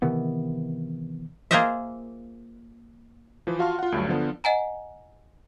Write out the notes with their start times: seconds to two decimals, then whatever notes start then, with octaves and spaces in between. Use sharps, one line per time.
0.02 C3 D#3 E3 B3
1.51 A#3 F4 G#4 C5 D#5 E5
3.47 E3 F3
3.59 F4 F#4 F5 A5 C6 F6
3.79 F4 F#5
3.92 D2 G2 F#3
4.08 D3 F3 B3 D4
4.44 D#5 F#5 G#5 A#5